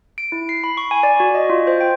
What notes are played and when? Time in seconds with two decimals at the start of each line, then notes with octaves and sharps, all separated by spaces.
0.18 D7
0.32 E4
0.49 C7
0.64 B5
0.77 C#6
0.91 G#5
1.03 D5
1.20 F#4
1.35 D#5
1.50 F4
1.67 C5
1.81 G5